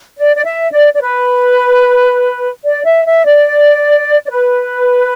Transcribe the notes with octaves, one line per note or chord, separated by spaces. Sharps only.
D5
D5
E5
D5
D5
B4
D5
E5
E5
D5
D5
B4